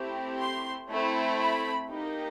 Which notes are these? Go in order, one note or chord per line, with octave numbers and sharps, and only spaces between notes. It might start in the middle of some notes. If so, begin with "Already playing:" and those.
Already playing: A3 C4 E4 G4
C6
A3 C4 E4
B5
A#3 D#4 G4